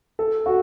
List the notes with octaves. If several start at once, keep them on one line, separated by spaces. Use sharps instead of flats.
A4
F#4